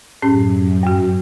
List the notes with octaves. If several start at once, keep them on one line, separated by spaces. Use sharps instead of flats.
F#2 A2 C#4 G4
G2 F#4